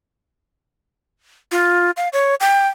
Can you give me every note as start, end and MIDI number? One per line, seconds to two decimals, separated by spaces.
1.52 1.91 65
1.97 2.09 77
2.13 2.35 73
2.40 2.68 79